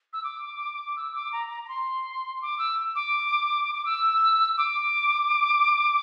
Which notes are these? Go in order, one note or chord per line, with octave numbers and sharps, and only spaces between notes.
E6
D6
E6
D6
A#5
A#5
A#5
C6
D6
E6
D6
D6
E6
D6